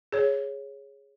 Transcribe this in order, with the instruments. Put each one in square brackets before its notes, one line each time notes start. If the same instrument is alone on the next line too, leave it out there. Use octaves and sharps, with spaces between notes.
[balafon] G#4 C#5